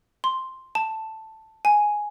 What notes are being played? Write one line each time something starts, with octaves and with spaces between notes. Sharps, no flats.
C6
A5
G#5